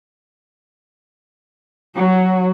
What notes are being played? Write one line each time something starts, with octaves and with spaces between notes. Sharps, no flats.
F#3 F#4